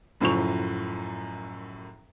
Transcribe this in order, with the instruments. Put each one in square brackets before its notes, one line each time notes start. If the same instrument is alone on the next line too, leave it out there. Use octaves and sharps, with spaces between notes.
[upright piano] F#1 F#2 A2 F3 C#6 F7